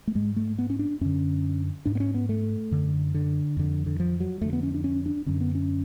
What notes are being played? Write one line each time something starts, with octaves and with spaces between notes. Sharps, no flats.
A3
G#2 G#3
A3
B3
C#4
D4
F#2 D3 C#4
G#2 D4
B3
C#4
B3
A3
F#2 D3
D3
F2 D3
D3
F3
F#3
F2 D3 A3
B3
C#4
D4
C#4
D4
F#2 D3 C#4
B3
C#4